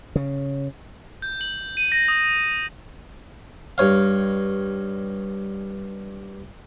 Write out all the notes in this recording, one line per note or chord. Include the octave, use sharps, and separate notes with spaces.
C#3
G6
F#7
D#7
A#6
D#6
G2 C#5 F5